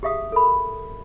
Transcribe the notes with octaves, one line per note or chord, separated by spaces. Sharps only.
G4 G#4 E5 F5 D#6
A4 A#4 B5